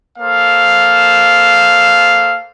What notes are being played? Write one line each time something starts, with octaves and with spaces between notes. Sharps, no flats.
A#3 A4 C5 F5